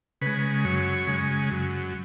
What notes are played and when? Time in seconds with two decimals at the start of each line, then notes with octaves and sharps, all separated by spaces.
0.21 C#3 G#3 B4
0.64 F#2 C#5
1.07 C#3 G#3
1.51 F#2